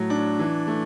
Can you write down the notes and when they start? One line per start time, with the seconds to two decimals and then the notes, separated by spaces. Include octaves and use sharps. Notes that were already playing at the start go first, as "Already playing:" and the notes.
Already playing: A2 F#3
0.10 D4
0.39 E3
0.67 A3